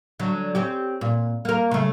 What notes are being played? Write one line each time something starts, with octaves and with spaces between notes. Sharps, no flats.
D3 F#3
C4 C#4 G4
A#2
A#3 A#4
C#3 A3